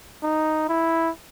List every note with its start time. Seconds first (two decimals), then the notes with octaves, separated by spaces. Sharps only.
0.23 D#4
0.69 E4